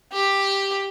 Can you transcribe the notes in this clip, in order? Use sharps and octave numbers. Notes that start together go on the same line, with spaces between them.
G4